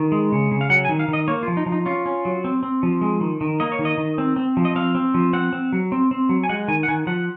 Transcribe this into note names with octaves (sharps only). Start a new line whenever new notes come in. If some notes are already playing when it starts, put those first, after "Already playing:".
Already playing: D#3
G#3
C#3
C#3
F5
F#3 F#5
G#5
D#3
F5
D#3
D#5
A#3 C#5
F4
F3
D#4
F3
D#4
C#4 F4
C#4
F#3
C4
C4
F3
G#3
D#3
D#3
A#3 D#5
C#5
D#3
D#5
D#3
C4
C4
F3
D#5
C4 F5
C4
F3
C4 F#5
C4
F#3
C4
C4
F#3
G#5
G#3 F#5
D#3 G#5
F#5
D#3 G#5
F3 F#5